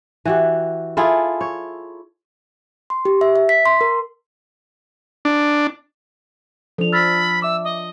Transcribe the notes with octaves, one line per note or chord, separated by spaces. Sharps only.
E3 F#4 G4
E4 F4 G#4 A4
C#5
C6
G4
E5
E5
B6
C6
A#4
D4
F3 D4 A4 F7
B5 E6 F6 A6
E5 D6 E6
D#5